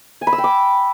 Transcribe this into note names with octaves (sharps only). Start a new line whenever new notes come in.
G#5
B5
E6
G5
D6